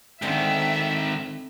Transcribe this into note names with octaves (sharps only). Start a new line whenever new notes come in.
G#2 D3 D#3 C4 C5 E5